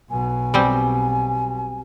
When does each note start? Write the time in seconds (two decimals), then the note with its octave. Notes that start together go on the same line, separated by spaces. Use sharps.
0.10 B1 B2 G#5
0.54 G3 C4